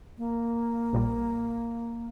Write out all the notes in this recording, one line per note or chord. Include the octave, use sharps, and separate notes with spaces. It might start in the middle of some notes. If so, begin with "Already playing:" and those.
A#3
A#1 A#2 G3